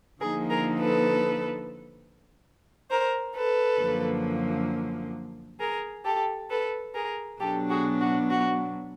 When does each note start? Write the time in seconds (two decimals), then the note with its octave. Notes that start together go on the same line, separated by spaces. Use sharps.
0.20 D3 F3 A#3 D#4 G#4 A#4
0.50 G#4 A#4
0.80 A4 B4
2.90 A#4 C5
3.35 A4 B4
3.80 F#2 D3 F3 A#3
5.60 G#4 A#4
6.05 G4 A4
6.50 A4 B4
6.95 G#4 A#4
7.40 B2 F#3 B3 D4 G4 A4
7.70 F#4 G#4
8.00 F#4
8.30 F#4